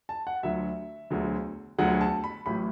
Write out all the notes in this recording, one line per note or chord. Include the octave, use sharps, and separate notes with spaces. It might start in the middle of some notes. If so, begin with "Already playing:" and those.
A5
F#5
D2 D3 F#3 E5
E1 D2 D3 F#3
E1 D2 D3 F#3 F#5
A5
B5
A1 A2 F#3 B5